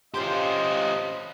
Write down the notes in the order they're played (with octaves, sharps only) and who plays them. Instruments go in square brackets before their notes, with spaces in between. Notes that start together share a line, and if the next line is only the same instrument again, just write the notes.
[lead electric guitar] C#4 G4 [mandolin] F4 C5 C6 [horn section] D#5